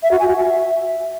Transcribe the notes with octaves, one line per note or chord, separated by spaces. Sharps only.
E5
F#4
G#5
F#4
E5